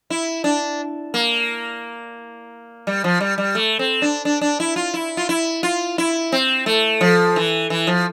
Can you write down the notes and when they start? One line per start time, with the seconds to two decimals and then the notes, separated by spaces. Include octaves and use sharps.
0.10 E4
0.44 D4
1.14 A#3
2.87 G3
3.04 F3
3.20 G3
3.38 G3
3.55 A3
3.79 C4
4.02 D4
4.25 D4
4.41 D4
4.60 E4
4.76 F4
4.94 E4
5.17 F4
5.29 E4
5.63 F4
5.98 E4
6.32 C4
6.66 A3
7.01 F3
7.36 E3
7.70 E3
7.87 F3